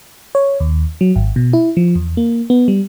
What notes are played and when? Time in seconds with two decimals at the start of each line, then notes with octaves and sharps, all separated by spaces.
0.35 C#5
0.60 D#2
1.01 F#3
1.16 G#1
1.36 B2
1.53 E4
1.77 F3
1.96 E2
2.17 A#3
2.50 B3
2.68 G3